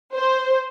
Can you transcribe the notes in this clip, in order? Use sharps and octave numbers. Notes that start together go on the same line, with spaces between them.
C5